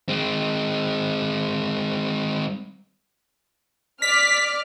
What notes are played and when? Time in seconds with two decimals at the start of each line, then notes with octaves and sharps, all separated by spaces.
0.08 G#3 C4
4.02 D5 F6 B6